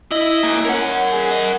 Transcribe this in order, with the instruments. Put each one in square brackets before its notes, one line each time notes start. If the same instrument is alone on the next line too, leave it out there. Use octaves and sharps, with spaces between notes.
[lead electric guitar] E4 [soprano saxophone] D#5
[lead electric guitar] A#3 E4
[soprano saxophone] C#4 [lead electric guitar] A#4 F#5
[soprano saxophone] G#4
D#5